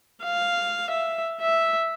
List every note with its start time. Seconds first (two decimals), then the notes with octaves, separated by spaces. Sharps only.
0.24 F5
0.91 E5
1.41 E5